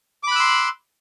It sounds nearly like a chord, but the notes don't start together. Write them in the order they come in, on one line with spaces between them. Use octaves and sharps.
D6 B5 F#6 E6 C6